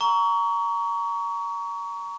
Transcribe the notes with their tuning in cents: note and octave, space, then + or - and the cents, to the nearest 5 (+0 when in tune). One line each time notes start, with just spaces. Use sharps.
A#5 +0 C#6 +30